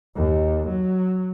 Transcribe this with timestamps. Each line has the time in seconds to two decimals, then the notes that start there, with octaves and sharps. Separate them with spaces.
0.16 D#2
0.69 F#3